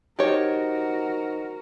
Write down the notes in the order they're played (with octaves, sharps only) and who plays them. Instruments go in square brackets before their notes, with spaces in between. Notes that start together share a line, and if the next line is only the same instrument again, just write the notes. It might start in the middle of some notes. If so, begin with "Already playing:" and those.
[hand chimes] D#4 C5 D#5 [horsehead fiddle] F#4 A#4 [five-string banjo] G4 C#5